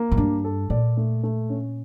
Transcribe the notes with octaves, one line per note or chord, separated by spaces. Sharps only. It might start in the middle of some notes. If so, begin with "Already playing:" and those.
Already playing: A#3
A2
G2 D4
A4
A#2 D5
A3
A3
C#4